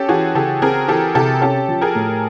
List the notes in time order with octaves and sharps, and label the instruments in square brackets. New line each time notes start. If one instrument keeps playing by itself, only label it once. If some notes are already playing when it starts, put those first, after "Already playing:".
Already playing: [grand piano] C#4 [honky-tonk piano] G4 A4
[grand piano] E3 [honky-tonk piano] F#4 G#4
[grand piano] C#3 [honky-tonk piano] G4 A4
[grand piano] C4 [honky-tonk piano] G#4 A#4
[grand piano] E3 [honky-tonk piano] G4 A4
[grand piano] C3 [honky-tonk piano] G4 A4
[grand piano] C#4 [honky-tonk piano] G4 A4
[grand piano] F3
[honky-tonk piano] G#4 A#4
[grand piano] A2